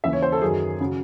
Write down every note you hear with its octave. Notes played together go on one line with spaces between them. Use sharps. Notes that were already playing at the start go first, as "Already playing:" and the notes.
D#2 C#3 E3 E5
C#5
C5
A4
F#2 D#3 F#3 G#4
C#3 F#3